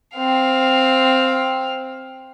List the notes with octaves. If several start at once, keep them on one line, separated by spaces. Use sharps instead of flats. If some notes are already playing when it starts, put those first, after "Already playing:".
C4 F5